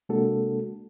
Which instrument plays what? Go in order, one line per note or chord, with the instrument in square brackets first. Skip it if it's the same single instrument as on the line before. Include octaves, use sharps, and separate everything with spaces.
[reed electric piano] C3 G#3 A#3 D4 F#4 A4